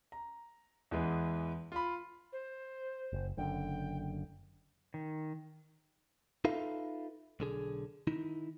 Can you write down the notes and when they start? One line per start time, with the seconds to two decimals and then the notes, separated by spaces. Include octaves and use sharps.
0.12 A#5
0.91 E2 E3 G#3 B3
1.72 F4 B5
2.32 C5
3.13 F#1
3.37 F#1 F#2 D3 G5
4.94 D#3
6.45 D#4 F4 A4 B4 E5 F5
7.40 B1 D3 G#4
8.07 D#3 D#4 E4